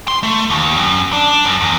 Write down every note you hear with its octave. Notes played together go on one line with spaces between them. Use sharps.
C6
A3
D#2
F#2
D4
F#2
E2